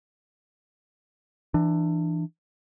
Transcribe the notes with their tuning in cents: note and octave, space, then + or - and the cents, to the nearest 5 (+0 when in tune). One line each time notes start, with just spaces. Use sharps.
E3 +10 D4 +25